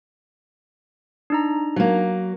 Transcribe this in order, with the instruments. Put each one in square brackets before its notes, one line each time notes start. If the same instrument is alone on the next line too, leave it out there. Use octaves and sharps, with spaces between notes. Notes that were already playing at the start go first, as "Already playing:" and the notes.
[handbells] D4 D#4 A#5
[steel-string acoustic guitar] F#3 A#3